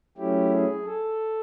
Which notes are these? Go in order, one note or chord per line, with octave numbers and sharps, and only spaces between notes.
F#3 A3 C#4 E4 G4
G#4
A4